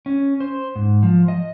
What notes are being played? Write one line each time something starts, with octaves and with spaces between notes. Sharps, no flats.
C#4
C5
G#2
F3
D#5